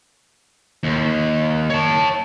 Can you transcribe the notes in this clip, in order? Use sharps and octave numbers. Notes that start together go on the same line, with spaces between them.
D#2
C#5 A5